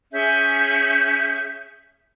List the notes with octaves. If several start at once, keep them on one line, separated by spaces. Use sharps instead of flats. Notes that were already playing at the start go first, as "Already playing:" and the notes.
C#4 G#4 E5 G6